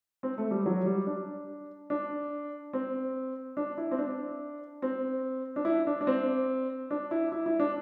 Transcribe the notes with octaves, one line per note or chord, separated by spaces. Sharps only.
C4
A3
G3
F#3
G3
D4
D4
C4
D4
E4
C4
D4
C4
D4
E4
D4
D4
C4
D4
E4
E4
E4
D4